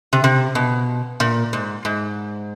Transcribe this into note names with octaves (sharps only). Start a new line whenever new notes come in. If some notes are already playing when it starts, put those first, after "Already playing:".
C3
C3
B2
A#2
G#2
G#2